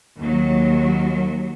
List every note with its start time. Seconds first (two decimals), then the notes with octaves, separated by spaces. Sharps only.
0.18 D#2 F#3